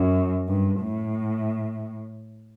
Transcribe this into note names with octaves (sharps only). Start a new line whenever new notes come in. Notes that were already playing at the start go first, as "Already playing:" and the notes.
Already playing: F#2
G2
A2